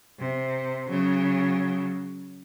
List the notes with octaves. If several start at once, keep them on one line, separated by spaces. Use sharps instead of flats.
C3
C#3 F#3